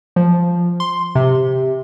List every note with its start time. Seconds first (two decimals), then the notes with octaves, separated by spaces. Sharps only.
0.16 F3
0.80 C6
1.15 C3